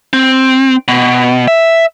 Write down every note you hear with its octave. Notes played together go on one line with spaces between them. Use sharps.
C4
B2
E5